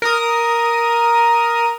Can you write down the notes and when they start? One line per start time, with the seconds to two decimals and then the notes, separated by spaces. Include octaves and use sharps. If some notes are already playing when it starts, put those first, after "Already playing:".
0.02 A#4 D#6